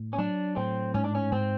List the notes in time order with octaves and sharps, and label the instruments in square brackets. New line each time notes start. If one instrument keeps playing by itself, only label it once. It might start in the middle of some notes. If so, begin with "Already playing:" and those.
Already playing: [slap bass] A2
[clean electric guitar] C#4
[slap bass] F#3 [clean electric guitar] D4
[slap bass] A2 [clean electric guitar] C4
[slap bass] G#2 [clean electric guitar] C#4
[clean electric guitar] D4
C#4
[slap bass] G#2 [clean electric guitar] C4